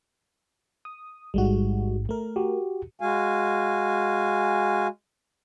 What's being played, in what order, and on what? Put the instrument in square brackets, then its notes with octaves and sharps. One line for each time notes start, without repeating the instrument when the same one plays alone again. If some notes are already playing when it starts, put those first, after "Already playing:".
[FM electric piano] D#6
[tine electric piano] A1 G#2 [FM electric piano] G3 G#3 F#4
[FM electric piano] A3 A#4
[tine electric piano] F#4 G4
[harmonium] G#3 F#4 F5 G#5